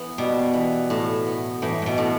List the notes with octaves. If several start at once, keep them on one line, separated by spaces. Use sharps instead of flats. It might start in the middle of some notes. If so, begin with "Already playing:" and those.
Already playing: E3 B3
B2 G3
E3
A2
B3
A2 E3
A2
B2
A2